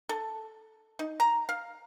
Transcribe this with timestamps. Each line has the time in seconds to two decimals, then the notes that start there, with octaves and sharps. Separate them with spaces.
0.09 A4
0.99 D#4
1.20 A#5
1.49 F5